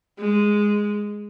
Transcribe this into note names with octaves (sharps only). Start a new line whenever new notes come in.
G#3